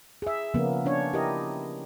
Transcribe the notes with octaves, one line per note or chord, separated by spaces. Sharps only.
G#4 E5
C#3 F3 A#3 B3 C#4
C#4 D4 C#5
E4 G4 A#4 D#5